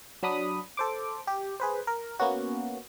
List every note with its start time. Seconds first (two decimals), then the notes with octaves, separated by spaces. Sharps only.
0.23 F#3 D4 B5 D#6
0.77 A4 C5 D6
1.27 G4
1.60 G#4 B4 C5
1.87 A#4
2.19 A#3 B3 C#4 F#4